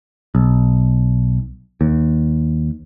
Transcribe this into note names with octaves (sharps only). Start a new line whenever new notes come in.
B1
D#2